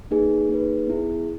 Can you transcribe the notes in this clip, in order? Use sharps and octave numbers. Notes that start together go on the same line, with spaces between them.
A#3 D#4 G#4 B4
A#3 D#4 G#4 B4
B3 E4 G#4